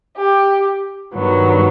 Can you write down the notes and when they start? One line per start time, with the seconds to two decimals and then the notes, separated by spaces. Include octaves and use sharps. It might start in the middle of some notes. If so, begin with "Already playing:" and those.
0.18 G4
1.15 G2 D#3 F#3 B3